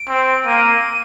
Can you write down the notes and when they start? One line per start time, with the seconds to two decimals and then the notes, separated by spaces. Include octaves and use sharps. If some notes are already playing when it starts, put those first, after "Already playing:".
Already playing: D7
0.09 C4
0.46 A#3 D#7